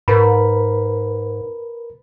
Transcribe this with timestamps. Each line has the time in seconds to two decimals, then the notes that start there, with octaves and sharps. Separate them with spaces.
0.08 G#2 A#4 B4 B5